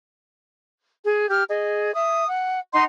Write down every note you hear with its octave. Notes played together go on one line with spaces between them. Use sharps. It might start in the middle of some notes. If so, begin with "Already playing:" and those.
G#4
G4 F6
G#4 D#5
E5 D#6
F#5
D#4 D#5 F#5 C6